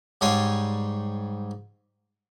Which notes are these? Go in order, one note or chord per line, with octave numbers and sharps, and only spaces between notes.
G#2 G3 C#5 G#5 C6